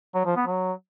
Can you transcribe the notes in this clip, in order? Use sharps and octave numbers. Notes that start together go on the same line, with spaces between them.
F#3
F3
B3
F#3